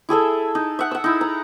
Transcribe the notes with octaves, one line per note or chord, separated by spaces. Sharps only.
E4 G#4 A4 E5
D#4
E5 F#5
F#5 E6
D#4 E4
A#5